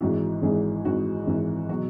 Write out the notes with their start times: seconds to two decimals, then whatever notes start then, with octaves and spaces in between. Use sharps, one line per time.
0.01 G#1 G#2 E3 F#4
0.43 G#1 G#2 E3 G#4
0.85 G#1 G#2 E3 F#4
1.27 G#1 G#2 E3
1.69 B2 F#3 F#4